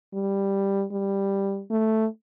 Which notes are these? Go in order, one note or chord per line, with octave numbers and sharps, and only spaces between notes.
G3
G3
A3